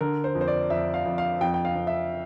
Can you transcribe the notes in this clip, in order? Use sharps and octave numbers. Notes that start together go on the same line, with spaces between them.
D3 A#4
C5
F2
C5
D5
F2 E5
F5
F2
F5
F2 G5
G5
F5
F2
E5